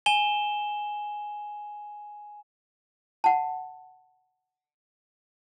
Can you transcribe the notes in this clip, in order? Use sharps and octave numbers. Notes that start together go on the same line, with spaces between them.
G#5 E7 G7
F#5 A5